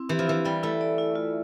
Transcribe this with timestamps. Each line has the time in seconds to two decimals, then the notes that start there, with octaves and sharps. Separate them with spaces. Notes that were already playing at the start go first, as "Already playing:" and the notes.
Already playing: C4 E4
0.09 E3 G4
0.19 F3
0.27 E3 E4
0.45 G3 D5
0.63 A3 E4
0.81 D5
0.98 E4
1.15 F4